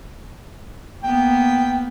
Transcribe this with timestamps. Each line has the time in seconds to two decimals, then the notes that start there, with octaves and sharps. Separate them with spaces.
1.03 A#3 B3 G5